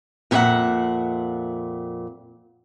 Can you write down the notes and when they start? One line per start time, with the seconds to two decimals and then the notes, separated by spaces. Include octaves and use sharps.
0.31 F2 A#2 D4 G#4 E5 F#5